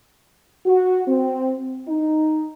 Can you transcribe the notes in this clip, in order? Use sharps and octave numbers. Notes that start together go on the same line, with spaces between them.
F#4
C4
D#4